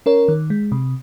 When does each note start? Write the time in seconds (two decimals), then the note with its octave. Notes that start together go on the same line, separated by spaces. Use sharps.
0.06 C#4 A#4 C#5
0.28 D#3
0.50 G#3
0.72 C3